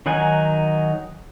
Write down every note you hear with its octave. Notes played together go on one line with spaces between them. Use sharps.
D#3 F#3 D#4 F#5 G#5